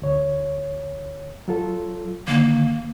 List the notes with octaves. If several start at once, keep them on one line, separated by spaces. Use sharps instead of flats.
D2 C#5
F#3 F4 A4
D3 D#3 A#3